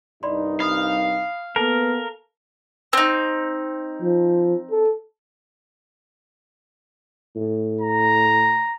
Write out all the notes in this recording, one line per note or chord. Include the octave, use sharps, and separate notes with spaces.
C2 G2 D#4 D5 B5 C6
F5 B5 D#6
A#3 B3 A4 A#4 A5
C4 D#4
F3
A4
A2
A#5